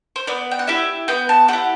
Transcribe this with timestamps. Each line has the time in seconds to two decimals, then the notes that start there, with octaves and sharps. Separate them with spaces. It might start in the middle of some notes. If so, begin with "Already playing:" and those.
0.16 C5
0.27 B3 D5
0.51 G5
0.59 F#5
0.67 E4 G4 E5
1.08 B3 G5
1.29 A5
1.48 E4 G4 F#5